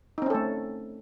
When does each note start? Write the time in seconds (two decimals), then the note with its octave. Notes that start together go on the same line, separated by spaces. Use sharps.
0.18 D#4
0.22 C4
0.26 C#4
0.30 A4
0.34 A3